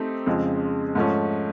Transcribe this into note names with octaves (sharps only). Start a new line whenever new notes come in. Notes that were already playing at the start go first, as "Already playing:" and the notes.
Already playing: A3 C4 D#4 G4
F2 C#3 F3 G#3 C4
G#2 F3 A3 C#4